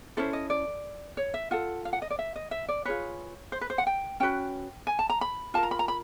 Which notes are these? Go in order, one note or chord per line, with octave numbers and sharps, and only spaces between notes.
C#4 E4 A4 C5
D#5
D5
C#5
E5
F4 A4 F#5
F5
F#5
D#5
D5
E5
D#5
E5
D5
F4 G#4 B4 C#5
C5
B4
C5
F#5
G5
C#4 F#4 B4 G5
G#5
A5
A#5
B5
F4 A#4 A5
A#5
B5
A#5
B5